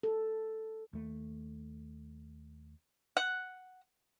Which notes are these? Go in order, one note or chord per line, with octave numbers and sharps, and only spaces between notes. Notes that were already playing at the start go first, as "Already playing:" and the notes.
A4
D#2 A3
F#5